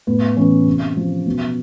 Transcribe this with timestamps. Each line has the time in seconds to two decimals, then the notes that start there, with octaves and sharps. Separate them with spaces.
0.07 A2 B3
0.37 E3 B3 C#4
0.67 C3
0.97 F3
1.26 B2